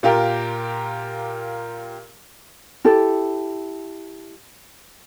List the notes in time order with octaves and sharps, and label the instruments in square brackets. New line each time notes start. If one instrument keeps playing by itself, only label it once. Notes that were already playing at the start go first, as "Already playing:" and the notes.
[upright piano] A#2 F4 G4 A#4
[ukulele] E4 G4 A4